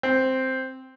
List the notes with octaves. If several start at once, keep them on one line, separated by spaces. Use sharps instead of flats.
C4